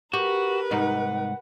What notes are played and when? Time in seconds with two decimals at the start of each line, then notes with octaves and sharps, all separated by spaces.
0.14 F#4 G4 A#4 B4
0.71 C2 G#2 D#4 F#5